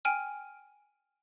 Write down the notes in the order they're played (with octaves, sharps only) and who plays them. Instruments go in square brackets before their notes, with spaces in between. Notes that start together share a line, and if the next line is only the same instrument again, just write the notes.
[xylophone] G5 G#5 F6